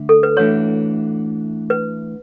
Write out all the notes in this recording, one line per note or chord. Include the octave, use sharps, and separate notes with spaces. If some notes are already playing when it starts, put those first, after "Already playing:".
Already playing: D3 A3
A4
B4
E3 A3 D4 F#4 C#5
B4